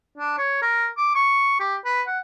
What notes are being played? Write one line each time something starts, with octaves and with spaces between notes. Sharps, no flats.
D4
C#5
A#4
D6
C#6
G4
B4
F#5